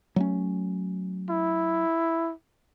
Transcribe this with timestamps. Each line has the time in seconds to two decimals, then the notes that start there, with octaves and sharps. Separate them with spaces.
0.16 F#3 A3 C#4
1.30 E4